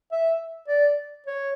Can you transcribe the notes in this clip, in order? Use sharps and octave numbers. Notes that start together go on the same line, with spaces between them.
E5
D5
C#5